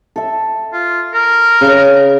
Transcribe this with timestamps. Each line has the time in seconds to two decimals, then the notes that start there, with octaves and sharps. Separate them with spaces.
0.16 A4 E5
0.73 F4
1.14 A#4
1.61 C#3